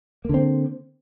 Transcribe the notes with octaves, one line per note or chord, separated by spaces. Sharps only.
D3 A#3 C4